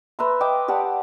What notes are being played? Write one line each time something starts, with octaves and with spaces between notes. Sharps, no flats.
B4 E5 A#5 C6
D#5 G5 D6
G4 D5 F#5 A5